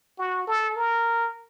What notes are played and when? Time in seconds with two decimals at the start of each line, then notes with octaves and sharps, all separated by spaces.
0.18 F#4
0.47 A4
0.76 A#4